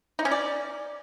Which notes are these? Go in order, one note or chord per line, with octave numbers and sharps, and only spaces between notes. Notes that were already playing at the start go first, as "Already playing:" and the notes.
D#4
C#4
D5